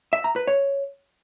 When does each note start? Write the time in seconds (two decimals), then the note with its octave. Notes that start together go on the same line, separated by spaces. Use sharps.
0.13 E5
0.24 A#5
0.36 B4
0.47 C#5